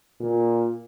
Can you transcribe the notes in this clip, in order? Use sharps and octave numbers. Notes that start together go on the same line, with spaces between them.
A#2